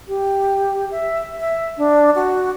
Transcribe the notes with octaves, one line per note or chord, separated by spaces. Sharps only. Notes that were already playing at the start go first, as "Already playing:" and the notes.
G4
E5
E5
D4
F#4